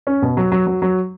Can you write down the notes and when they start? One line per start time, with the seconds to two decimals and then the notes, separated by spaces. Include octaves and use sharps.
0.07 C#4
0.22 B2
0.37 F#3
0.52 F#3
0.66 F#3
0.82 F#3